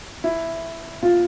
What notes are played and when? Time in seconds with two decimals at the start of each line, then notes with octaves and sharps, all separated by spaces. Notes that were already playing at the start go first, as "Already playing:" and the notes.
0.24 E4
1.03 F4